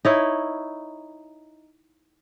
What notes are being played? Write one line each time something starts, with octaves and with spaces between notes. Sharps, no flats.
D#4 E4 C#5